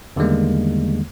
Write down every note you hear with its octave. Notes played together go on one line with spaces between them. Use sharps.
E2 D3 D#3 G3 G#3 A#3